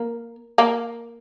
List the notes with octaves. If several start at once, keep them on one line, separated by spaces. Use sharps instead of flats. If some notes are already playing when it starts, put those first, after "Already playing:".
Already playing: A#3
A#3